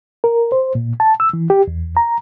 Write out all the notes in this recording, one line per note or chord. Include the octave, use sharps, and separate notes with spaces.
A#4
C5
A#2
A5
E6
E3
G4
E2
A#5